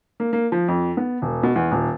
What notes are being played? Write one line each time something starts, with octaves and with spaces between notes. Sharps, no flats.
A#3
A#3
F3
F2
B3
E1
B2
E2
D#1